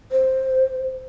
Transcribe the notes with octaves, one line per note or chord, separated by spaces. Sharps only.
C5